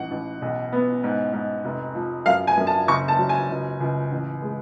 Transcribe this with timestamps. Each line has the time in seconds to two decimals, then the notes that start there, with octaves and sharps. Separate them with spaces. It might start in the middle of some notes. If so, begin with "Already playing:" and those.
Already playing: A1 G#2 F#5
0.11 A1
0.42 B1
0.72 B3
1.04 G#2
1.33 G#2
1.65 F1
1.95 F3
2.26 F#2 F5
2.47 G#5
2.57 F#2
2.67 A5
2.88 F#1 C#6
3.08 A5
3.18 F#3
3.29 G#5
3.50 C#2
3.80 C#2
4.12 A1
4.42 G#3